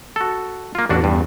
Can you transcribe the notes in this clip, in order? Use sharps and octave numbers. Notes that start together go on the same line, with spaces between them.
F#4 A4
A#3 F4
A1 E2 D4 F#4
G2